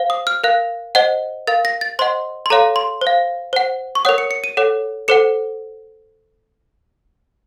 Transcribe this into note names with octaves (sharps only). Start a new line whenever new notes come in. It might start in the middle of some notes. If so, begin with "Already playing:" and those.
Already playing: C5 F5
D#6
F6
A#4 F5 F#6
C5 D#5 F#5
A#4 F5 A6
A#6
A6
C5 D#5 F#5 C6
C6
A4 C#5 F5 A#5
C6
C5
F5
C5 F#5
C#6
A#4 C#5 F#5 D#6
C#7
C#7
D#7
A4 C#5 F#5
A4 C5 F#5 C#7